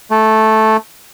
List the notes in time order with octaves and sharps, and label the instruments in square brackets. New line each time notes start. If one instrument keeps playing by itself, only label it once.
[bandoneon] A3